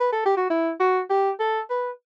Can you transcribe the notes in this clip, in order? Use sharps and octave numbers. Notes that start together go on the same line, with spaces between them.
B4
A4
G4
F#4
E4
F#4
G4
A4
B4